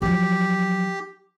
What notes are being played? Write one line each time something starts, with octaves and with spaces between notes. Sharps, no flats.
F3 F#3 G4